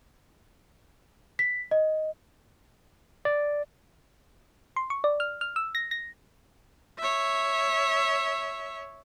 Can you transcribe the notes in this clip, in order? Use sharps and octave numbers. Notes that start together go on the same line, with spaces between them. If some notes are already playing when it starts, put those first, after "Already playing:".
B6
D#5
D5
C6
C#6
D5
F6
F6
E6
A#6
A#6
C#5 E5